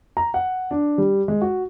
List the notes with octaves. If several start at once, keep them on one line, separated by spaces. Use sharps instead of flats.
A#5
F#5
D4
G3
G#3
F#4